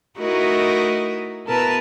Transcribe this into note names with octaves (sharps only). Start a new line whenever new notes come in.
A3 D#4 E4 F#4 A#4 D#5
B2 E4 A#4 B4 A5